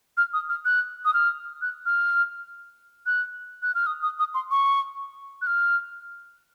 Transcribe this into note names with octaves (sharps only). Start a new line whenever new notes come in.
F6
D#6
F6
F#6
D#6
F6
F#6
F6
F#6
F#6
F6
D#6
D#6
D#6
C6
C#6
F#6
F6